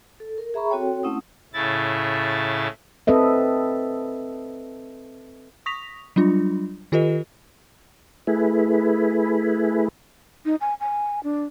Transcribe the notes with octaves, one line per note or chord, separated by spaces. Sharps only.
A4
A#4
G#4 E5 A#5 B5 C#6
C4 F#4 A4 C#5 G5
A3 C4 C#4 E4 F#5 D#6
A2 C#3 E4 A6
C4 A4 B4 D#5 E5
C#6 D#6 A#6 B6 F7
F#3 G3 D4 F4
D#3 F4 G4 A4 B4 D#5
A3 E4 G#4 B4
D#4
G#5
G#5
D4